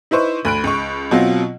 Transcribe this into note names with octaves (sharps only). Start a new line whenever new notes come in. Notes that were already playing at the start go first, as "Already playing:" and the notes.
D#4 E4 B4 C5 C#6
D2 B5 F#6 D7
C#2 C#6
B2 F#3 C4 F4